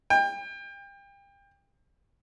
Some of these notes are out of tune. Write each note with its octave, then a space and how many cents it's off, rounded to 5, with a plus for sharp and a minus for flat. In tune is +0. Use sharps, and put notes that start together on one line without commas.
G5 +30